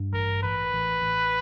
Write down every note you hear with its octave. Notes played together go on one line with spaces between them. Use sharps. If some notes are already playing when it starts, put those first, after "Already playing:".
Already playing: G2
A1 A#4
A1 B4
A1
A1